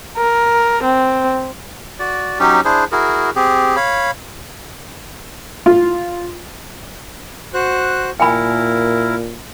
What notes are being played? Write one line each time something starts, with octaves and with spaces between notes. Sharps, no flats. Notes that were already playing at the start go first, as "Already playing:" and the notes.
A#4
C4
F#4 D5
F#3 C#4 D#4 G4
D4 E4 G#4 C5
E4 F#4 G#4 A#4
C4 G4 G#4
C#5 F5 B5
F4
F#4 C5 F#6
A#2 E4 A#4 G5 G#5 B5